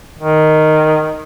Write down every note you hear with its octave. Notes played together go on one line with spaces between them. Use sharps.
D#3